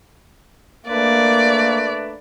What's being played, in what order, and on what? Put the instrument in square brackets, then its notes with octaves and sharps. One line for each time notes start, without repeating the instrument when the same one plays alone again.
[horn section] A3 D4 B4 [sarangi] A#3 [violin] D5